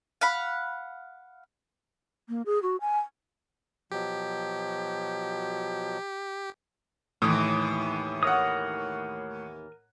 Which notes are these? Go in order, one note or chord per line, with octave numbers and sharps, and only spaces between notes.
F5 F#5 B5
A#3
G#4
F#4
G#5
B2 F3 F#3 G4
D#2 A2 E3 D#6
A#4 C#5 F#5 D#6